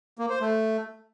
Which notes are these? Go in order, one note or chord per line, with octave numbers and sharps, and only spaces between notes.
A#3
C5
A3